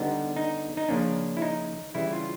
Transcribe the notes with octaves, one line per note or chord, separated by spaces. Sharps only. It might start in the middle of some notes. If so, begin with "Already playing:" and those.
Already playing: D3 G3 B3 D4 D#4
D#4
D#4
C#3 F3 A#3 C#4 D4
E4
D#4
C#3 E3 G3 E4
F4